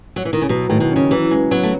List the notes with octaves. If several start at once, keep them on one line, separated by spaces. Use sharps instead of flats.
F#3
E3
D#3
C#3
B2 F#3
A2 D#3
B2
C#3 C#4
E3 F#3
C#3 G#3
F#3 B3
A3